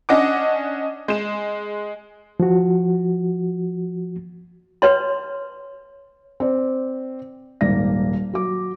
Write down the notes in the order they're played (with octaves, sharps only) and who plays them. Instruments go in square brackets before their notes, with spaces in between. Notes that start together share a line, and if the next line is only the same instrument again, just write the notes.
[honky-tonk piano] C#4 D4 D#5 F#5 D6
G#3 E7
[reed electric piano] F3 F#4
[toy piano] B4 C#5 C6
[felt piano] C4 D5
D#1 G#1 A#3 D5 A#6
F#3 D6